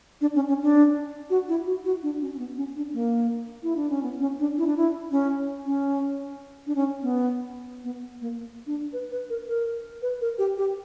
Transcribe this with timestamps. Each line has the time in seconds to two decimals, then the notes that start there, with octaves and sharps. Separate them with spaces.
0.21 D4
0.35 C#4
0.48 C#4
0.62 D4
1.30 F#4
1.49 E4
1.67 F#4
1.85 F#4
2.03 D4
2.21 C#4
2.33 C#4
2.39 B3
2.57 C#4
2.76 D4
2.94 A#3
3.63 E4
3.76 D4
3.90 C#4
4.03 B3
4.20 C#4
4.39 D4
4.58 E4
4.67 D4
4.77 E4
5.11 C#4
5.66 C#4
6.67 D4
6.75 C#4
7.02 B3
7.84 B3
8.21 A#3
8.67 D4
8.93 B4
9.11 B4
9.30 A#4
9.48 A#4
10.02 B4
10.21 A#4
10.38 G4
10.58 G4